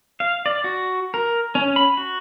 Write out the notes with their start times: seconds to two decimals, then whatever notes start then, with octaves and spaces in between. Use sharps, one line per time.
0.20 F5
0.46 D5
0.64 F#4
1.14 A#4
1.55 C#4
1.76 B5
1.97 F#4